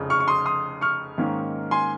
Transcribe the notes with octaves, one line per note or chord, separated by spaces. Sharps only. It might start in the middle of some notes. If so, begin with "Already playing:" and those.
Already playing: F1 F2 C#3
C#6 F6
C#6
C6 D#6
C6 D#6
C#6 F6
G#2 D#3 A#3 C#4
G#5 C6